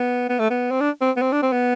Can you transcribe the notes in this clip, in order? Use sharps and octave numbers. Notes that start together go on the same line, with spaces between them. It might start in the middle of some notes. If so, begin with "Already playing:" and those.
Already playing: B3
B3
A3
B3
C4
D4
C4
B3
C4
D4
C4
B3